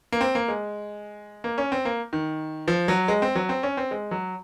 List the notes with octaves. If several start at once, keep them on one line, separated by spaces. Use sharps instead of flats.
A#3
C4
A#3
G#3
A#3
C#4
C4
A#3
D#3
F3
F#3
G#3
C4
F#3
C4
C#4
C4
G#3
F#3